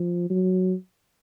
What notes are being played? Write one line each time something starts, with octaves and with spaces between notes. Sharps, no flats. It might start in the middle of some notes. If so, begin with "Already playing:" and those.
Already playing: F3
F#3